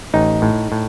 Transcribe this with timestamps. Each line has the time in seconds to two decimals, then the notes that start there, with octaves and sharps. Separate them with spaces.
0.14 A1 D#4
0.42 A2
0.72 A2